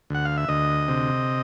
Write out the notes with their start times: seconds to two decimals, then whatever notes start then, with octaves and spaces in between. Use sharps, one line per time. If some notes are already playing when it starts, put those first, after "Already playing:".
0.10 D2 F#5
0.25 F5
0.37 E5
0.48 D2 D#5
0.88 C3